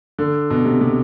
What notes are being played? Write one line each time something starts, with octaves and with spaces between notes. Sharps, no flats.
D3
B2
C3
C3